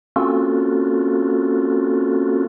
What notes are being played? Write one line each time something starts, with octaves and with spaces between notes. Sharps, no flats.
A#3 C4 C#4 F4 F#4 A4